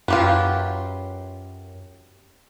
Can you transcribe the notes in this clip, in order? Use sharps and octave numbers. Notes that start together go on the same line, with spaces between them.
F#2 F4 G4 B4